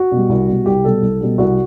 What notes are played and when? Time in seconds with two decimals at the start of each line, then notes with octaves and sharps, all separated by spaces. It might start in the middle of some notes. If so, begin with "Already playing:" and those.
Already playing: F#4
0.12 B2 G3
0.29 C2
0.49 B2 G3
0.66 C2 G4
0.84 B2 G3 A4
1.02 C2
1.21 B2 G3
1.38 C2 F#4